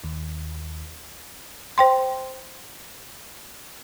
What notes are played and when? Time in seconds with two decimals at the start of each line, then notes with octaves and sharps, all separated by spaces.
0.04 D#2
1.78 C5 G5 C6